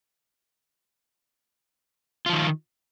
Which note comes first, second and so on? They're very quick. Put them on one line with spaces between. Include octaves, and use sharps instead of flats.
F4 F3 D#3